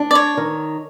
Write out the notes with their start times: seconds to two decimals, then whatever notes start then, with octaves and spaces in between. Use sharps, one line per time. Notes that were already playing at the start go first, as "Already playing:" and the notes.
Already playing: D4
0.11 D5
0.15 C#5
0.37 D#3